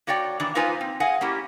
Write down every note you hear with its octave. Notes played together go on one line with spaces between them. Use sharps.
A#3 F#4 C#5 D5 G5
D#3 E3 D4
A#3 D#4 F4 B4 C5 G#5
C4
G#4 D#5 F5 F#5 G#5
A#3 C#4 E4 G4